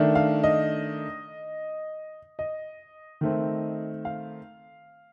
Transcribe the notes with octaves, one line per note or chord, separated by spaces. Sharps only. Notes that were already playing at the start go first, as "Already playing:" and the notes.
Already playing: D#3 A3 D4
F5
D#5
D#5
D#3 A3 C4
F5